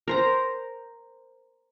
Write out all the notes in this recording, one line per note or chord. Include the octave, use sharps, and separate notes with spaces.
A#4 C5 A#5